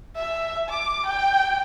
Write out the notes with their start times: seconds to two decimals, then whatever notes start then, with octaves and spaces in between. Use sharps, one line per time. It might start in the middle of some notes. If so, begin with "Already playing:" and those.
0.15 E5
0.69 D6
1.06 G5